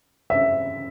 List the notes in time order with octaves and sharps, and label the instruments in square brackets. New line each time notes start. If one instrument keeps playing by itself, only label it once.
[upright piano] E5